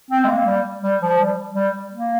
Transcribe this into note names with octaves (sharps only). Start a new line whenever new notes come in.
C4
G#3
A#3
G3
G3
F3
G3
G3
A#3